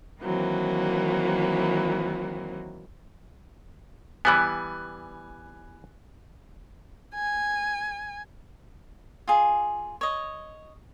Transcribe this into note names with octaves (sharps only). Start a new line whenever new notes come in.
D#3 E3 F#3 A#3 C4
E3 G3 B3 G#5 F#6
G#5
F4 G#4
C#5 D#5